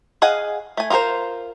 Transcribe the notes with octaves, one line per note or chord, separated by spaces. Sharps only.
G#4 D#5 F5 F#5 G#5
A3 G#5
F4 F#4 G#4 A#4 C5